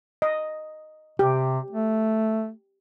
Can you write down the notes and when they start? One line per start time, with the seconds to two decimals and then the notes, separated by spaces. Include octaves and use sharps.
0.22 D#5
1.19 C3 G4
1.70 A3